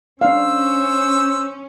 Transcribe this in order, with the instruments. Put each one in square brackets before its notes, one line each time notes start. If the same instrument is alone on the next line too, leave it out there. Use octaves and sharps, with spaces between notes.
[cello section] C#4 [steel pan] D4 F5 [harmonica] C5 E6